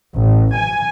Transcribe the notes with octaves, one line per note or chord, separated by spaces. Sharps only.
A1
G#5